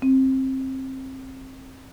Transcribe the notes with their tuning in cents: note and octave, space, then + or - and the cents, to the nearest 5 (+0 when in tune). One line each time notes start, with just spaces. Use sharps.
C4 +20